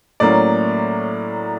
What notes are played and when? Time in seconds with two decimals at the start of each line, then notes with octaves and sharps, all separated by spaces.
0.20 A2 F#3 A#3 C#4 D5